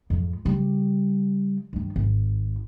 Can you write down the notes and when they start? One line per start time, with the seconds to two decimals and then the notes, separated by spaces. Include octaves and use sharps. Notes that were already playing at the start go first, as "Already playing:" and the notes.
0.10 F2 G#2
0.45 C#3 G3
1.73 G2 D#3
1.96 G#1